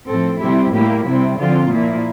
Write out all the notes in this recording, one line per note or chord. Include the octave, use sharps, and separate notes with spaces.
A2 F3 C4 A4
C3 G3 C4 E4 G4
A2 G3 A#3 E4 G4
C3 G3 C4 E4
D3 F3 C4 F4
A#2 F3 A#3 E4